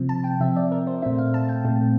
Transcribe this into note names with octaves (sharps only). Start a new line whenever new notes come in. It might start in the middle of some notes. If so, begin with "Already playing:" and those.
Already playing: C3 F3 C4
A5
G5
C3 F3 C4 E5
D5
A#4
C5
A#2 A3 C4 E5
F5
A5
G5
A#2 A3 C4